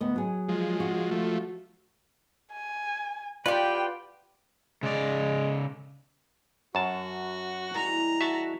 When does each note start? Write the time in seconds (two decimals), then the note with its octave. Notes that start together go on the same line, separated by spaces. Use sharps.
0.01 D2 B3 D#5
0.16 F#3 G#4
0.49 F3 G#3
0.80 F#4
1.11 F3 A3
2.52 G#5
3.46 F4 G4 B4 D5 F#5 G5
4.83 C#3 G#3 D5
6.75 F#2 F#4 A5
7.75 E3 G3 G#3 A#5
8.21 F#4 E5 A5